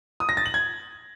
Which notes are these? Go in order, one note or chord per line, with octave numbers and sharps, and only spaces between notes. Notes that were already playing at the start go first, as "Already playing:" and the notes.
D#6
A#6
A6
F#7
G#6